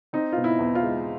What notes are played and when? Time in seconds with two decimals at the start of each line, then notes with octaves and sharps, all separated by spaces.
0.13 C4 D#4
0.32 B2 F4
0.44 E4
0.59 E2
0.75 F4
0.83 G#3